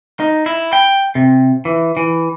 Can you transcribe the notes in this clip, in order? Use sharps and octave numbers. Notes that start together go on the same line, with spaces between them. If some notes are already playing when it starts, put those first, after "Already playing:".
D#4
E4
G5
C3
E3
E3